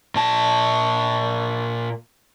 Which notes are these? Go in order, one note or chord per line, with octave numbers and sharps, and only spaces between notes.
A#2 A5